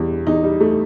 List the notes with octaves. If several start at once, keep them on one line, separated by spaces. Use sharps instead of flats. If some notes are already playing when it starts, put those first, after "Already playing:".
Already playing: E1 E2 G3
E2 D#4
G3
A3